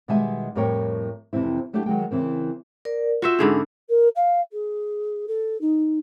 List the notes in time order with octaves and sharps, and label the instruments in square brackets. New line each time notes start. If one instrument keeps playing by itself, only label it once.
[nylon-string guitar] B2 D#3 G3 G#3 E5 G#5
F2 A2 G3 A#4 C#5 G5
F2 C3 E3 C4 E4
F#3 A3 D4 E4 G4
D#3 F#3 G#3 G5
C#3 E3 C4 A#4
[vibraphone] A#4 D5
[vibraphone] F4 [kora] F#4 C5 E5
[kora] G#2 D3 G#4 [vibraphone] C#4 D4 B5
[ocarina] A#4
F5
G#4
A4
D#4